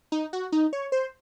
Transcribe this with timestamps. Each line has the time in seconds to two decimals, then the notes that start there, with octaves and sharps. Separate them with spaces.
0.12 D#4
0.33 F#4
0.52 D#4
0.73 C#5
0.92 C5